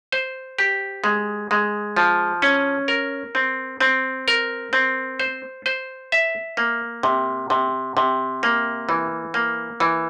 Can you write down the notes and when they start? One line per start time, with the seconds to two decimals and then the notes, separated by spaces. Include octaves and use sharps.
0.12 C5
0.58 G4
1.04 G#3
1.51 G#3
1.97 F3
2.42 C#4
2.88 A#4
3.35 C4
3.80 C4
4.28 A#4
4.73 C4
5.20 C5
5.66 C5
6.12 E5
6.57 A#3
7.03 C3
7.50 C3
7.97 C3
8.43 A#3
8.89 E3
9.34 A#3
9.80 E3